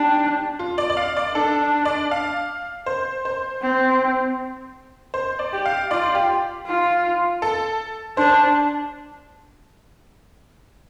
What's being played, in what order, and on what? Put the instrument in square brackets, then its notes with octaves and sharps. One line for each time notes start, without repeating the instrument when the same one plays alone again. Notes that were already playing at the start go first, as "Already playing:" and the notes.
Already playing: [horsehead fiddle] D4 [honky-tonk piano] G4
[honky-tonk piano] F4
D5
D5
F5
D5
[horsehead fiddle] D4 [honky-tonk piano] A4
[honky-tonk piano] D5
F5
C5
C5
[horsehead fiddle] C4
[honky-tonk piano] C5
D5
[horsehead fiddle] G4
[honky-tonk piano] F5
[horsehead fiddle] F4 [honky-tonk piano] D5
[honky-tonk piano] G4
[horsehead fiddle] F4
[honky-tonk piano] A4
[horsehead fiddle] D4 [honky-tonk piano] C5